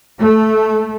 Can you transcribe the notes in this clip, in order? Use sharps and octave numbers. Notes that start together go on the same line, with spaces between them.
A3